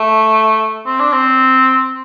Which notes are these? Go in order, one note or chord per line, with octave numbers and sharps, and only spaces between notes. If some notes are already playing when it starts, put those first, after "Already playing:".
Already playing: A3
C4
D4
C4